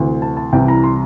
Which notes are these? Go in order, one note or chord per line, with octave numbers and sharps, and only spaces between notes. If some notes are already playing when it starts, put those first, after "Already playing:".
Already playing: D2 C3 E3
A5
A5
C2 C3 E3 G3 G5
A#5
C6